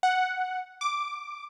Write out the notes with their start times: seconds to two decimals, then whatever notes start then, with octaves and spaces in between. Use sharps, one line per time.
0.03 F#5
0.81 D6